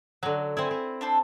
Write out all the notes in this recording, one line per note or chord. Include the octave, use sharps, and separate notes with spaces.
D3 F#3 F#4
C4 E4 G#5 E6
C4
D4 A4 C5